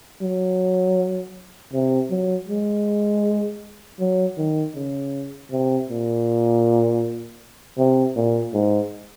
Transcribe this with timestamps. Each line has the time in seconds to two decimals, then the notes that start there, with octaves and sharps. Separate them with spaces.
0.22 F#3
1.73 C3
2.11 F#3
2.48 G#3
4.00 F#3
4.38 D#3
4.75 C#3
5.51 C3
5.89 A#2
7.78 C3
8.16 A#2
8.54 G#2